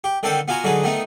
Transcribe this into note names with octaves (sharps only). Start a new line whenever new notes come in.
G4
D3 D#3 C4 A4 B4 C5
B3 F4 F#4 G#5 A#5
D3 F#3 D#4 G#4 B4
D#3 A3 B3 D#4